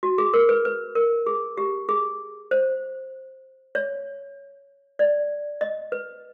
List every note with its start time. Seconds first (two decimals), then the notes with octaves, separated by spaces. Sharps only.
0.03 F#4
0.18 G#4
0.34 A#4
0.49 B4
0.65 B4
0.95 A#4
1.26 G#4
1.57 G4
1.89 G#4
2.51 C5
3.75 C#5
4.99 D5
5.61 D#5
5.92 B4